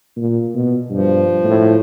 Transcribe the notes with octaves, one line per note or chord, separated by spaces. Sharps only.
A#2
B2
G2 F3
A2